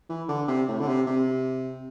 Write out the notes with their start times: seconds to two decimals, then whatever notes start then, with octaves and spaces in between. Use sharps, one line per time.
0.09 E3
0.29 D3
0.48 C3
0.68 A2
0.80 D3
0.87 C3
1.07 C3